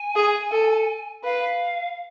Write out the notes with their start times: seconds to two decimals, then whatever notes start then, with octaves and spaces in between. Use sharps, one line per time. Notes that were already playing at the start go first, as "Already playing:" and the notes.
Already playing: G#5
0.16 G#4
0.51 A4
1.24 B4 F5